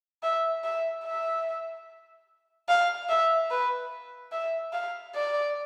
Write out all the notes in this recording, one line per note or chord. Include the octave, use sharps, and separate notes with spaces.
E5
E5
E5
F5
E5
B4
E5
F5
D5